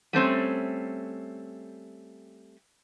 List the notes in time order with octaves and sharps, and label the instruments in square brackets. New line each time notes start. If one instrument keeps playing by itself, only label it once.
[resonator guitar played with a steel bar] G3 A3 C4 C#4